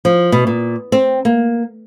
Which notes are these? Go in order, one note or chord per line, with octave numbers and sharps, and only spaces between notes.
F3
B2
A#2
C4
A#3